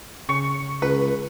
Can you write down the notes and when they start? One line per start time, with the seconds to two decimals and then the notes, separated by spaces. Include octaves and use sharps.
0.29 C#3 C#6
0.82 C#2 B4